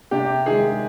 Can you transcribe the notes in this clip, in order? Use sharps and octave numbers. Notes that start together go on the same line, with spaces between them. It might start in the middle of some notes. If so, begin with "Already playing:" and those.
C3 G4
D#3 G#3 G#4